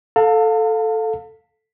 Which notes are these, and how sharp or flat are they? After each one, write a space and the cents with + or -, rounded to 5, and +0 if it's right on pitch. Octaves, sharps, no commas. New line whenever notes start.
A4 +0 F5 +20 A5 +40